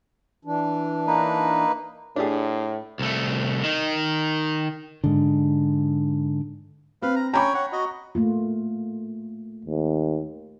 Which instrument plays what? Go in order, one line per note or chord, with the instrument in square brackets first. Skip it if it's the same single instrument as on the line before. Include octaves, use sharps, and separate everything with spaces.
[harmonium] E3 D4
[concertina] A#3 D#4 B4
[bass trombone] A2 [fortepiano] D4 G4 G#4
[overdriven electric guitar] C2 A3
D#3 D#4
[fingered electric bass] G#2 D3
[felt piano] C4 [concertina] B4 F5
[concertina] A#5
[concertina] C#4 G5 G#5 [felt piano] A#5 B5 C#6
[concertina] C#5 F#5
F#4 D#5
[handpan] A3 A#3 F4
[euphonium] D#2